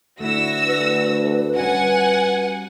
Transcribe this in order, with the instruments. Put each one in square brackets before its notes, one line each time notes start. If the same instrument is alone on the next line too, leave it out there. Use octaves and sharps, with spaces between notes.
[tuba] D2 [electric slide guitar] A3 E4 [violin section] F#4 E6 A#6
[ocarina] B4
[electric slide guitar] G3 C#4 F#4 [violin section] F#5 G#5